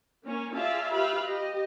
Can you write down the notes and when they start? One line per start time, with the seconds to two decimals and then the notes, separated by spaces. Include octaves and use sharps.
0.24 A#3 C#4
0.55 F4 G#4 D5 E5 F5 A5
0.92 F4 G4 B4 E5 F5 B5
1.26 G4 D#5